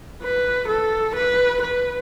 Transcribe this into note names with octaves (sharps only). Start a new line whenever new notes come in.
B4
A4
B4
B4